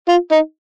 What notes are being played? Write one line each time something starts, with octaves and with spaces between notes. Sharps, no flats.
F4
D#4